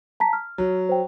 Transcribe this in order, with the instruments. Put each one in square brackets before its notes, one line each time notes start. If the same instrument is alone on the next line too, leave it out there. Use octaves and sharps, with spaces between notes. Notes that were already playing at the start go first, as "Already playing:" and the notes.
[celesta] A5 A#5 B6
F6
[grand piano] F#3
[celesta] C5 G5